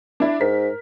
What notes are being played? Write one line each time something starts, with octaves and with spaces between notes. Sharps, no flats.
D4 E4 E5
G#2 A#4 B6